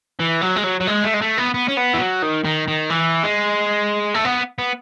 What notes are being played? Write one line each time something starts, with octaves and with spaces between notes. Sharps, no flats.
E3
F#3
G#3
F#3
F#3
G#3
A3
G#3
A3
B3
B3
C#4
B3
E3
F#3
D#3
D#3
D#3
E3
G#3
A3
B3
B3